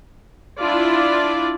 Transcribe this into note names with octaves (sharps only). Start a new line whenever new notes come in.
D4 E4 F4 D5